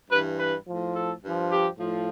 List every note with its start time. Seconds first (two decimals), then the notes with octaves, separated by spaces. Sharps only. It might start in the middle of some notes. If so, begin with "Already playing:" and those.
0.10 G2 E3 B4
0.39 B4
0.67 A2 F3
0.95 A4
1.24 G2 F3
1.51 G4
1.79 A2 F3